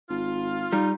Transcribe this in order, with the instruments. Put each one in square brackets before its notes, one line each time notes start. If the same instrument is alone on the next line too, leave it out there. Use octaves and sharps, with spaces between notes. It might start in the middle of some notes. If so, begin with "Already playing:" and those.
[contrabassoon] G#1 [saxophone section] F4
[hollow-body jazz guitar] G3 [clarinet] D#4